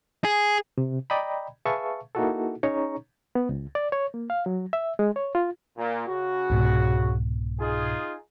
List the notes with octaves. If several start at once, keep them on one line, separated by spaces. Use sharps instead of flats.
G#4
C3
D5 D#5 G5 A#5 B5
G#4 B4 E5 F5 A5 C#6
A#3 D#4 E4 F#4 G#4 A4
C#4 D#4 G#4 C#5 A#5 C#6
B3
C#2
D5
C#5
A#3
F5
F#3
E5
G#3
C#5
F4
A#2
C#3 F#4
C2 G#2 B2
D#4 F4 G#4